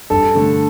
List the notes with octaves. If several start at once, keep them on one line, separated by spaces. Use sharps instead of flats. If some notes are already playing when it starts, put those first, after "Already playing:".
G2 A4
D3 A3